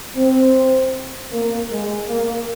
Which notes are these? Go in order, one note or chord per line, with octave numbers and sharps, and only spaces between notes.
C4
A#3
G#3
A#3